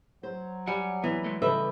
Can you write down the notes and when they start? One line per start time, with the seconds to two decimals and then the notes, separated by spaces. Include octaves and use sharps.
0.23 F#3 C5
0.67 G3 F#5 G#5
1.04 E3 B3
1.24 G#3 A3
1.42 C#3 G3 A4 B4 D#5 E5